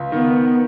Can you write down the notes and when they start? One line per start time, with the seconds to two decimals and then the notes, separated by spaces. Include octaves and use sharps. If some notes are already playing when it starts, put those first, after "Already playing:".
Already playing: C#2
0.12 D#3 B3